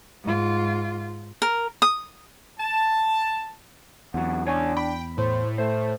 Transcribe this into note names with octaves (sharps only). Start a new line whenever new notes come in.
G#2 F4
A#4
D#6
A5
E2 G#2 F#3 F#5
C#2 D4 C#5 G#5
G5 B5
A2 C5
A3 C5